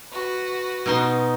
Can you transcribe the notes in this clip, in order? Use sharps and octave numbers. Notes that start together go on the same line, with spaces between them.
F#4 B4
B2 D#4 C6